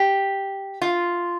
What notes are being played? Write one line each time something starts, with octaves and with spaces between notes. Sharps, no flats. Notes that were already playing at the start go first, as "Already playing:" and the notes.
Already playing: G4
F4